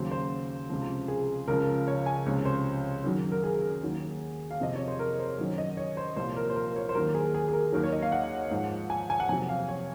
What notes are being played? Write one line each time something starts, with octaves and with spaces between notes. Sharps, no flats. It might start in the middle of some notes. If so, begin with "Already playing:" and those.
Already playing: D#2 C#3 F#3 C5
C5
C#2 C3 F3
G#4
C#2 C#3 F3 A#4
C#5
G#5
C#2 C3 F3 C#5
C5
F#2 D#3 F#3
A#4
G#4
D#2 D#3 F#3
F5
F2 C3 F3 D#5
C#5
C5
A#4
C5
F#2 D#3 F#3 C#5
D#5
C#5
C5
C2 A#2 F3 C5
A#4
C5
A#4
C#5
C5
D#2 D#3 F#3 A#4
G#4
G#4
G#4
A#4
D#2 D#3 F#3 A#4
C#5
D#5
F5
F#5
G#2 F3
G#5
G#5
F#5
F2 C3 F#3 G#5
F5
C#5